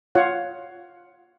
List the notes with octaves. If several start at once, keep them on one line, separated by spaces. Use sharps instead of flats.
F4 C#5 F5 F#5